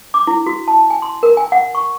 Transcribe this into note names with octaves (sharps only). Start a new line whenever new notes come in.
D6
E4
F#4
A5
G#5
C6
A#4
G#5
F#5
C#6